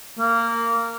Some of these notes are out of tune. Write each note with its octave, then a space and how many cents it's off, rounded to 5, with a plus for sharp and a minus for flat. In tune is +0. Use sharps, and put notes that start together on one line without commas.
A#3 -15